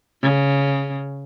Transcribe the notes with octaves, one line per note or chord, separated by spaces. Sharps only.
C#3